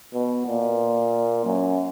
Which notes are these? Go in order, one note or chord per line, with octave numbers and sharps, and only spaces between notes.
B2
A#2
F#2